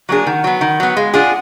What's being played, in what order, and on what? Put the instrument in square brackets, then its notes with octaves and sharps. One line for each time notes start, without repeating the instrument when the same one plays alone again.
[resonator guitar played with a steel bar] F#3 A#3 D4 G#4
[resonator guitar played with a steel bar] D#3 [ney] F#5
[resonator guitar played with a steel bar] F#3 B3
D#3
F#3 B3
[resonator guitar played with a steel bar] G#3 [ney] F5
[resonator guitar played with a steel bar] D4 F4 G#4 [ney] F#5